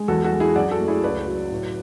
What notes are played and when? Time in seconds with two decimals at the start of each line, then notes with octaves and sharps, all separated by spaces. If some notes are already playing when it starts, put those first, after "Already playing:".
Already playing: G#3
0.08 E2 F#4 A4
0.24 F#4 A4
0.32 G#3
0.40 E4 G#4
0.56 F#2 D5 F#5
0.71 F#4 A4
0.80 A3
0.88 E4 G#4
1.04 C#2 B4 D5
1.26 F#3
1.51 A2